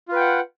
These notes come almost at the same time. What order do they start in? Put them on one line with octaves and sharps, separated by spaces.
F4 B4 G5 F#5